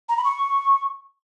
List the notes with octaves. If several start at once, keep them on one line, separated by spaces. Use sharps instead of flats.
A#5
B5
C#6